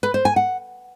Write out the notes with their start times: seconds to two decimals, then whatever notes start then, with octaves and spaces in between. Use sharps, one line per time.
0.03 B4
0.14 C5
0.25 G#5
0.36 F#5